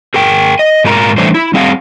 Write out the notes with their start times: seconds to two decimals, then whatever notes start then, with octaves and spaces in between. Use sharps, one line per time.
0.14 G#4 A#4 G5
0.59 D#5
0.84 G#2 G#3 F4 A#4 A#5
1.18 E3 G3 A3 D4 C5 D5
1.34 E4
1.54 G3 C4 G#4 F5 F#5